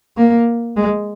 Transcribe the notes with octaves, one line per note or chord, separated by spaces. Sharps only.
A#3
G#3